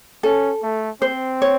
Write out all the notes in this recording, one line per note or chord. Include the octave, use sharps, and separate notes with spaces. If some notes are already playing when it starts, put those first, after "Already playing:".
C#4 A4
A3
C4 C5
C#5